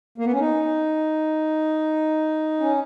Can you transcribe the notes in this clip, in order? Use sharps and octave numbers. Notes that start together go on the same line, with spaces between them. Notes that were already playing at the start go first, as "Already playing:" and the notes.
A#3
B3
C#4
D#4
C#4